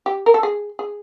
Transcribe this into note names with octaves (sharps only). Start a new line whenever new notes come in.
G4
A#4
A4
G#4
G#4